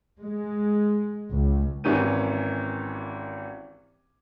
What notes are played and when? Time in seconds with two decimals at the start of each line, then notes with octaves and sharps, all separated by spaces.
0.20 G#3
1.31 C#2
1.84 G#1 E3 C#4 G4 A#4 D#7